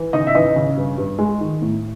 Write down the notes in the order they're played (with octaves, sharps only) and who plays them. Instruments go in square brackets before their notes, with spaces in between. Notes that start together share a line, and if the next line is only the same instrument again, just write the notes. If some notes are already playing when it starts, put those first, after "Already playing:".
Already playing: [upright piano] E3
C#3 D#4 D#5
E5
E3 D#4 D#5
C#3
G2
G2
G#3
D#3
A2